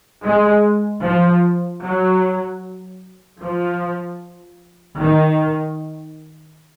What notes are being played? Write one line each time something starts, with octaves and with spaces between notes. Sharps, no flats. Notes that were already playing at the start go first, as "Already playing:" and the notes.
G#3
F3
F#3
F3
D#3